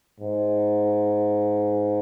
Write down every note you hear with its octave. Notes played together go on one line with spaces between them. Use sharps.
G#2